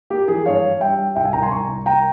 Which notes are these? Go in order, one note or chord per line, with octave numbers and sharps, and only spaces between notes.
A#3 G4
E3 G#4
G2 C#5 F5
G2
G3 E5 G5
G3
C2 E5 G5
F5 G#5
C2 G5 A#5
G#5 C6
C2 A#5 C#6
C2
A#3 G5 A#5